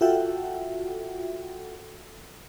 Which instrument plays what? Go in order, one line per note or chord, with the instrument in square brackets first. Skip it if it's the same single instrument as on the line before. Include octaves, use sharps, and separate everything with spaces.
[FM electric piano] F4 F#4 A4 E5 F#5 G5